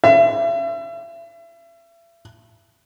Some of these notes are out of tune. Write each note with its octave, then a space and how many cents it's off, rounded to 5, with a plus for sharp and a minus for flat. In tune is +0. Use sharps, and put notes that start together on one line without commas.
E5 +35